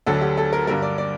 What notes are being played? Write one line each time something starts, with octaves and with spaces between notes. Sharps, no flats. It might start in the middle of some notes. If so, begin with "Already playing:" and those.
D2 D3 F#3 A4
G4
A4
A#4
G2 D3 G3 A#4
D5
D5